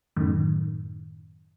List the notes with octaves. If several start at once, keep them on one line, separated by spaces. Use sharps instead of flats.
F#2 A2 D#3